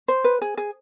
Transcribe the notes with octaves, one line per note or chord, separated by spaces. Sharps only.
C5
B4
G#4
G#4